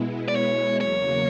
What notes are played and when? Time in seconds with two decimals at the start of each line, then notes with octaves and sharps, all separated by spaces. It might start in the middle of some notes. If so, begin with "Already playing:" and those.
Already playing: B2 G#3 B3 E4
0.28 D5
0.35 C#5
0.80 E2 C#3 F#3 A#3 C#5